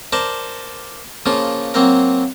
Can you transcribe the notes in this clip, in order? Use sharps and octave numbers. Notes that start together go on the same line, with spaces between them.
A#4 C5 D5 A5
C#3 F3 A#3 F4
F#3 A#3 C4 A#4